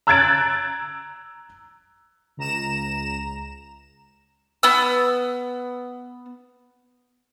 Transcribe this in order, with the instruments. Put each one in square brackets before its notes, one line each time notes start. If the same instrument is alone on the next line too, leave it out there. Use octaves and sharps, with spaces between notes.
[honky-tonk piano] A#5 E6 F#6 G#6 A6 D7
[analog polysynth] C#2 A#5 E7
[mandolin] B3 E6